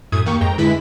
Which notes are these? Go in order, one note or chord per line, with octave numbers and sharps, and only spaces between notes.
F#2 A2 D#6 G#6
D#2 A#3 G4 C#6
F2 G#2 G5 A#5
D3 G#3 E4 B4 B6